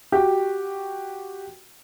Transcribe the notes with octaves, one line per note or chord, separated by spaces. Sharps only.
F#4 G4